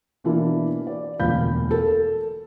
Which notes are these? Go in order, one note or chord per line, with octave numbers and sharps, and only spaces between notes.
B2 E3 A#3 D4 E4
D5
E1 D2 A#2 F5 B5 G6
A4 A#4